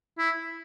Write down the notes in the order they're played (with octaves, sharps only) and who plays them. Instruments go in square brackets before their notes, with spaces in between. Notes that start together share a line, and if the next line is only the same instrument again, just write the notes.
[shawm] E4